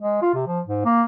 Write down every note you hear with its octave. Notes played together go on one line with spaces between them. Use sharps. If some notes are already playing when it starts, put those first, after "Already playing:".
G#3
F4
C3
F3
G#2
A#3